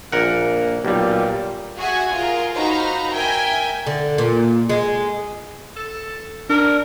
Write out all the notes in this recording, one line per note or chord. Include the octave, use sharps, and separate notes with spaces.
A#1 A#3 A#4 F#5
B1 A#2 G3 G4
F#4 G#4 E5 F#5 G#5
F4 G#4 A#4
D#4 F#4 C5 F5 A#5 B5
A#4 E5 G5 G#5
D3
A#2
G#3
A4
D4 A#4